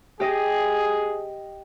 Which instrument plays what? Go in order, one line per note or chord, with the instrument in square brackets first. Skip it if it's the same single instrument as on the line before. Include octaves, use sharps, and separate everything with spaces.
[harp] G4 D#5 [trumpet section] G#4